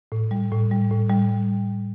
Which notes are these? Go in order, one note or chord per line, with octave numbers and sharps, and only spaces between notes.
A2
G3
A2
G3
A2
G3